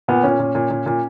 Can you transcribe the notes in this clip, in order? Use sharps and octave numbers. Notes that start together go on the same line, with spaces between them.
A#2 B3
A#2 C#4
A#2
A#2
A#2
A#2